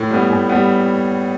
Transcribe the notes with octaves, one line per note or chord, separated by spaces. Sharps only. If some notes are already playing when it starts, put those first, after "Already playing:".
Already playing: A2
G3 B3
A2
G3 B3